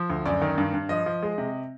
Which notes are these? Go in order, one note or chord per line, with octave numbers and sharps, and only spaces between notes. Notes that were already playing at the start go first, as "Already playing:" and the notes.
Already playing: F3
D2
F#2 D5
D#3
G2
G2
F3 D#5
F3
G#3
C3